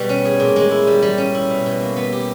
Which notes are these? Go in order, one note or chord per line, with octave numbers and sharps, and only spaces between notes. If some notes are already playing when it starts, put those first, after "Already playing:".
Already playing: B2 G3 B3
C#4
G#4
A#2
G#3
E4
G3
G3
C#4
E4
B2
B2
A#3
B3
G4